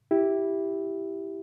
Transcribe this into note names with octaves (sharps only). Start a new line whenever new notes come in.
E4 G4